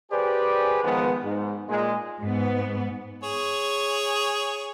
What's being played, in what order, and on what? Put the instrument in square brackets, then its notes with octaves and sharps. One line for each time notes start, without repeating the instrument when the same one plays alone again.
[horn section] G4 G#4 B4 C5 D5 G#5
D#3 F3 G#3 B3
G#2
A#2 G#3
[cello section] G#2 B3
[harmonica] G#4 C#5